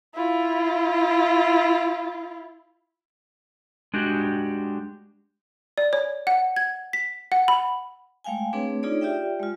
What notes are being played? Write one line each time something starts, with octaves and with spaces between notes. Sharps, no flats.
E4 F4
G#3 D4 F#4 G4
D5
C#5
F#5
G#6
B6
F#5
B5
G#3 A3 F5 G5 G#5
A3 C4 D4 G#4 B4 C#5
D4 D#4 F4 G#4 C#5 D5
F4 G4 D5 E5 G5
G#3 F4